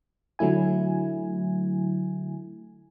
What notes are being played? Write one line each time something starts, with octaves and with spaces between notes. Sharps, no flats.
D3 F#3 A3 E4 G#5